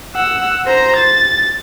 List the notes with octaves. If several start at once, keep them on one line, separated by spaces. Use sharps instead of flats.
F#5 E6
C5 A#5
A6